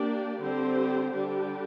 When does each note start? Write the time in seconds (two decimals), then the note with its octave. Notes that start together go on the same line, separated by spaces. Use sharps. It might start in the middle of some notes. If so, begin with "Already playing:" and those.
Already playing: A#3 D4 G4 D5
0.40 D3 G3 C4 G4 C5
1.15 D3 G3 D4 G4